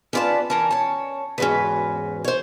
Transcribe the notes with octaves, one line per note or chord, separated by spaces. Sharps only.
B3 C#4 F4 B4 D5 A5
E3 C#4 A#4 A5
C#5 A5
E2 G#2 C#4 F#4 B4
C5 C#5